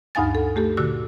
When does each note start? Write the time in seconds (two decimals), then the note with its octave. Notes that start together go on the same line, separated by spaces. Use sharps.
0.15 D2 G2 D#4 F5 G#5 A6
0.35 A4
0.56 A3 G4 A4
0.77 A#2 D3 F#4 E6